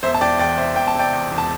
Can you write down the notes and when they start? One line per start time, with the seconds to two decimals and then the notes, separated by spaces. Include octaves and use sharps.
0.03 E1 C5 E5
0.14 A5
0.21 E1 D5 G5
0.39 E2 D5 G5
0.58 C3 C5 E5
0.76 E1 G5
0.88 A5
0.95 C3 D5 G5
1.13 E2
1.32 E1
1.38 A5